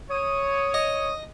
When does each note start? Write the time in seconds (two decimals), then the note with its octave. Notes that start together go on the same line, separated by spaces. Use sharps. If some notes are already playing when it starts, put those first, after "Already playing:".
0.10 C#5 D#6
0.74 D#5